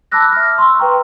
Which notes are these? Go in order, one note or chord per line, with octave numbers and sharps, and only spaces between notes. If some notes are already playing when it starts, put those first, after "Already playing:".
A5 B5 D6 E6 F#6 A#6
E5 F6
C6 C#6 E6
B4 G5 A#5